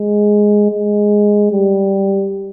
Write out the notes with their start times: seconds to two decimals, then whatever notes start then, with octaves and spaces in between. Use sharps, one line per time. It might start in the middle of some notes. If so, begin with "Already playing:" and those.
Already playing: G#3
0.71 G#3
1.52 G3